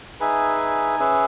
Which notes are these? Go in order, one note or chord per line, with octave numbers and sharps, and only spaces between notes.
D#4 G#4 B4 E5 G#5
C#4 G#4 B4 E5